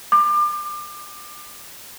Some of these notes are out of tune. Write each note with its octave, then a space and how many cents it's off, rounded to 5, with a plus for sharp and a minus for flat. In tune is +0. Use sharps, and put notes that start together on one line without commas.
D6 +30